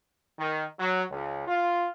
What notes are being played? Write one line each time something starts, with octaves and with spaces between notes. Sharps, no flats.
D#3
F#3
C#2
F4